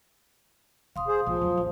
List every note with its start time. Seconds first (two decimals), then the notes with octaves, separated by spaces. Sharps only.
0.96 E1 F5 C6 D#6
1.08 G#4 C5
1.26 A#1 G#2 F3
1.41 E2 F#3
1.57 A1